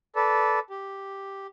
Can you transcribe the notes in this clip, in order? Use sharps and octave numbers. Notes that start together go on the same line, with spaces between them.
A4 B4 D5
G4